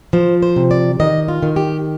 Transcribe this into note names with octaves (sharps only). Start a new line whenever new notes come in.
F3 C5
C5
C3
D5
D#3 D#5
F4
D#3
G4